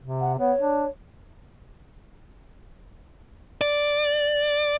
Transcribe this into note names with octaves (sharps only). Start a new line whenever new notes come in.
C3
F#5
B3 C#5
D4
D5